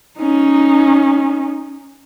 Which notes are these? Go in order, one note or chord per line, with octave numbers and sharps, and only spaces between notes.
C#4 D#4